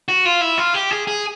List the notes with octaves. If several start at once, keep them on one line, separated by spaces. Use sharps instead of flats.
F#4
F4
E4
F4
G4
G#4
G#4